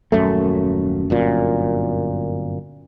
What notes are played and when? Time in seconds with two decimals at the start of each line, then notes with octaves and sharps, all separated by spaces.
0.12 D#1 F#2 A3
1.10 G1 F#2 A#2